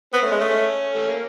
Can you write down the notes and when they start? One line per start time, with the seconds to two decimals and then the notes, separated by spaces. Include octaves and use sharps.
0.13 B3 C4
0.22 A3
0.25 C#4
0.31 G#3
0.38 C#4
0.41 A3
0.49 C#4
0.94 A3
1.08 A#3